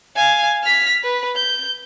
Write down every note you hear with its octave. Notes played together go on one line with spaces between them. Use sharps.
F5 G#5
F6 B6
B4
G6